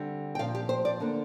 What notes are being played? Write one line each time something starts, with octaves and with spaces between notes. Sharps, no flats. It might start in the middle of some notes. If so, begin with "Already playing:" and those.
Already playing: D3 G3 C4
G5
A#2 F3 C4 F5
G4
C5
D5
D3 A#3 D4